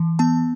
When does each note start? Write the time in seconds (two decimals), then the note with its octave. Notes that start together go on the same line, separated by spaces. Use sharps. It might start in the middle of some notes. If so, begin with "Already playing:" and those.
Already playing: E3
0.19 B3 A5